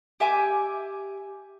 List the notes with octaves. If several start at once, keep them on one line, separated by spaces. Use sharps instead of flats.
G4 E5 G#5 D6